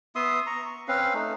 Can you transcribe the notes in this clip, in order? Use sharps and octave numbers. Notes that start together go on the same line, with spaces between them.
B3 E5 C6 D#6
A#5 C#6
C#6
C4 C#4 B4 F5
A3 D#4